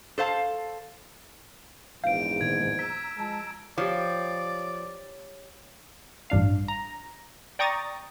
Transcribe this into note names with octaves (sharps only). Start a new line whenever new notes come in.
A4 C5 F5 A5
A#1 E2 G#2 F5 G6 D7
A#2 D#3 G#3 G#6
A#5 E6 B6
F3 G#3 A5
F3 G4 C#5 D5
A1 G2 D4 F5
A#5
D5 G5 A#5 C#6 D#6 A6